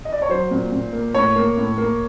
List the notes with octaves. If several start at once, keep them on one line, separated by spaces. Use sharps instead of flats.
D#5
D5
C#5
F#3 C5
A#2
A#2
A#3
A2 C#5
A#3
A2
A#3